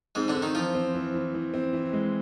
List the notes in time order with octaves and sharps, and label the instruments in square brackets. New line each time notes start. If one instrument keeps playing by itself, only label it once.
[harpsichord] G#2 G#3 [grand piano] C4
[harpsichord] D3 D4
[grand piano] C4
[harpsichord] D#3 D#4
[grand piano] E3 [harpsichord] F3 F4
[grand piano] C4
E3
E3
E3
C4
E3
G#3